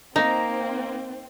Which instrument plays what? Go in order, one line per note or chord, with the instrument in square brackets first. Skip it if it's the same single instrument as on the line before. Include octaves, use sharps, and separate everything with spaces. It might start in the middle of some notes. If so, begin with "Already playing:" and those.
[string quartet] A#3 [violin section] C4 [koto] D#4 [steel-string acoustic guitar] A#5